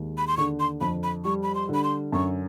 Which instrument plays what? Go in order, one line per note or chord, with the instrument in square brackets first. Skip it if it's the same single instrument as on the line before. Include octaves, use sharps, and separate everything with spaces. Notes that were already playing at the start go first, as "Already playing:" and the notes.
Already playing: [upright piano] D#2 G#3
[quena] B5
C6
[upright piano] D3 [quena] C#6
[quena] C6
[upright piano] F2 [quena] B5
[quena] B5
[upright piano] G3 [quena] C#6
[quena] B5
C6
[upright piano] D3
[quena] B5
C6
[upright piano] F#2 [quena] C#6